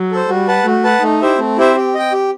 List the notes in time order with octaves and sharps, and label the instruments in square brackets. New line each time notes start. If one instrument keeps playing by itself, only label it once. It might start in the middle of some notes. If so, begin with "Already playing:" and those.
Already playing: [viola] F#3
[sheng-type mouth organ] A4 C5
[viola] G3 [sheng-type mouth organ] F#4
[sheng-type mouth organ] B4 F#5 A5
[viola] A3 [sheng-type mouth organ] F#4
[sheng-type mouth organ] B4 F#5 A5
[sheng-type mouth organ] A3 [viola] D#4
[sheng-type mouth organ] E4 G4 C5 E5
[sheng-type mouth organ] A3 [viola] C4
[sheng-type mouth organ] E4 G4 C5 E5
G4
D#5 G5
G4